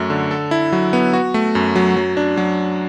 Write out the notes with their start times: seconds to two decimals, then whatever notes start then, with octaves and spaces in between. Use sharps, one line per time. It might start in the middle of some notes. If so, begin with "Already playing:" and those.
Already playing: F#2 A3 F#4
0.10 D3
0.31 A4
0.51 E4
0.72 F#3
0.93 B3
1.13 F#4
1.34 A3
1.55 F#2
1.76 F#3
1.96 F#3
2.17 D4
2.37 F#3